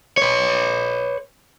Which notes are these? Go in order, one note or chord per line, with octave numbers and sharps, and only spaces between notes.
B4 C#5